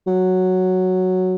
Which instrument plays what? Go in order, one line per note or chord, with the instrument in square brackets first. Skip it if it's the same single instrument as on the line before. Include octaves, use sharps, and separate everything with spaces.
[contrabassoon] F#3